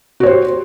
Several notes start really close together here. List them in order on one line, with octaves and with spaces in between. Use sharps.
F#4 C#5 C5 G4